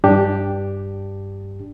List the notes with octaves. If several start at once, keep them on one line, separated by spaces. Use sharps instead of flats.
G2 D4 G4